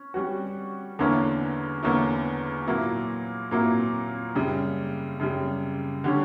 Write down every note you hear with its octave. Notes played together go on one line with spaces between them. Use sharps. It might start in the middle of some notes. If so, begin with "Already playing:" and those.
Already playing: C#4
G3 C#4 F#4
E2 D3 A#3 C#4 E4
E2 D3 A#3 C#4 E4
A#2 F#3 A#3 E4
A#2 F#3 A#3 E4
F#2 C#3 G3
F#2 C#3 G3
D3 G3 C#4